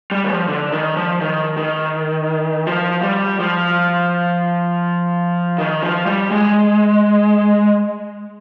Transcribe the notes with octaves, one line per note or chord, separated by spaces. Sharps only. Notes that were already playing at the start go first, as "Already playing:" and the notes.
G3
D#3
F3
D3
D#3
F3
D#3
D#3
F3
G3
F3
D#3
F3
G3
G#3